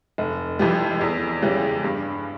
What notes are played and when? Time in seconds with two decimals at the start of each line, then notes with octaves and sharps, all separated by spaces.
0.18 F1
0.59 F2 E3 G3
1.01 E2
1.42 C#3 E3 G3
1.84 G2